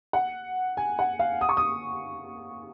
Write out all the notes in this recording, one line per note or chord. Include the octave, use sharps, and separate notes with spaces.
F#5
G#5
F#5
F5
D#6
C#6
D#6